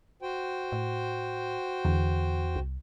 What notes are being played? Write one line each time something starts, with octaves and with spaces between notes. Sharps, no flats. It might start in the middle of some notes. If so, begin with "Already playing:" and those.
F#4 C5 G5
A2
E2 D3
C2